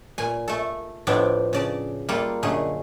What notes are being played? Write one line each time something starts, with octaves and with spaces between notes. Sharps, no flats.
A#2 G#5
A3 A4
F2 A2 B3 C4 D4 D5
C#3 D5 A5
G3 A#3 F4 A4
F#2 A#2 D3 A3 G#4 D#5